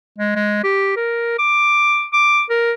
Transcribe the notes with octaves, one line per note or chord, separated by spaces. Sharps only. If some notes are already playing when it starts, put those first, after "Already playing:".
G#3
G#3
G4
A#4
D6
D6
A#4